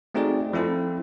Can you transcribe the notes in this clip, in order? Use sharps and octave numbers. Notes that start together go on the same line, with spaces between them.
A3 C4 D#4 F#4 G#4 D5
F3 C4 E4 A4 C5